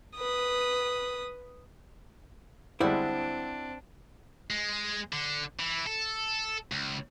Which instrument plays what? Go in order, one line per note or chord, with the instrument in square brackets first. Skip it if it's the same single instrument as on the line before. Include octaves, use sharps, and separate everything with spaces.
[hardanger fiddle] B4 D#6
[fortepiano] D2 G3 G#3 [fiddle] C4 D4 [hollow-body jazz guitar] E4 C5 F#5
[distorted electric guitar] G#3
D3
E3
A4
C#2